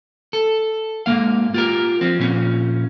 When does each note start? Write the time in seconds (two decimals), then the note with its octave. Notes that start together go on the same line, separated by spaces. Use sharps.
0.33 A4
1.06 G#2 E3 A#3 F5
1.54 F4 G4 A#4
2.01 F3 C4
2.19 A#2 F3 C#4